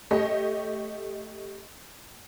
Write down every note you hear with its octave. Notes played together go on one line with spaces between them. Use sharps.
A3 G4 C#5 D#5